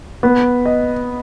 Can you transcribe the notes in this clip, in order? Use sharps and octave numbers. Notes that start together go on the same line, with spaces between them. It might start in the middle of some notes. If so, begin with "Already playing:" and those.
B3
D#5